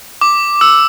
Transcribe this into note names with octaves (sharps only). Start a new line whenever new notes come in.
D6
E6